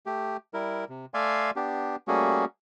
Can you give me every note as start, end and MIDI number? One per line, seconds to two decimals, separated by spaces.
0.06 0.37 57
0.06 0.37 67
0.54 0.85 55
0.54 0.85 64
0.54 0.85 70
0.89 1.06 48
1.14 1.51 57
1.14 1.51 74
1.14 1.51 76
1.14 1.51 77
1.14 1.51 80
1.14 1.51 84
1.56 1.96 59
1.56 1.96 62
1.56 1.96 67
2.08 2.45 55
2.08 2.45 57
2.08 2.45 58
2.08 2.45 61
2.08 2.45 66
2.08 2.45 68